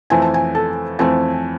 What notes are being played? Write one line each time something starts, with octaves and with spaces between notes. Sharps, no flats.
F2 E3 A3 C4 G#5
A5
G#5
A4
F2 E3 A3 C4 G#5